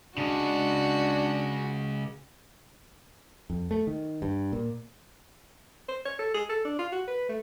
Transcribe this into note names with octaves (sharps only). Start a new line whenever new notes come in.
C#3 G#3 D4 F#4
F2
A3
D#3
G2
A#2
C5
C#5
A4
G#4
A4
D4
F4
F#4
B4
A3